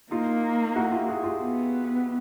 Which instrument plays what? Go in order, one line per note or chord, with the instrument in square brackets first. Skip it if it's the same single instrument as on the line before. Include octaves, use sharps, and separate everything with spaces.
[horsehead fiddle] A#3 [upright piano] D#4 F4
[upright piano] E4 F#4
F4 G4
F#4 G#4
F4 G4
[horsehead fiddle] B3